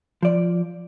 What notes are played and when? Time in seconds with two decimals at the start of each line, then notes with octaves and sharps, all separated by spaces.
0.23 F3 D5